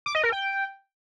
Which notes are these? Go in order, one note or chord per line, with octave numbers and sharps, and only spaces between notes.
D6
D#5
A#4
G5